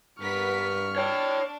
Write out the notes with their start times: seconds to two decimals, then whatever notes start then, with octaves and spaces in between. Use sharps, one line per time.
0.20 G2 B3 A#4 C#6 F6 B6
0.96 D4 C#5 G5